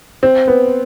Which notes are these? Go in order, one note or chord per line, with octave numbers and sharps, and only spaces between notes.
C4
B3